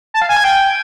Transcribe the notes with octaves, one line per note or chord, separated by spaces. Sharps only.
A5
F5
G#5
G#6
G5